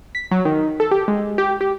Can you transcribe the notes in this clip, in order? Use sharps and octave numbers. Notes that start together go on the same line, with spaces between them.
B6
F#3
D#3
A4
G4
G#3
G4
G4